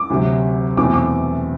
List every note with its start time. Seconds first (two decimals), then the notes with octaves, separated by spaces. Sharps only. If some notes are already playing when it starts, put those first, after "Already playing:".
Already playing: D6
0.10 D2 C3 F#3
0.77 E2 B2 A3 C4 D6
0.94 D6